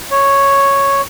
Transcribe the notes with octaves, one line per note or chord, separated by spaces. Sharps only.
C#5